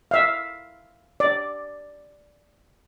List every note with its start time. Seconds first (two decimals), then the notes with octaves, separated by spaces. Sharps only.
0.11 E5 F5
1.20 D5